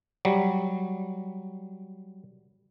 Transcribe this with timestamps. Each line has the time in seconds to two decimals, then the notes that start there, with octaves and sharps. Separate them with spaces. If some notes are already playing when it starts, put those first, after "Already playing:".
0.25 F#3 G3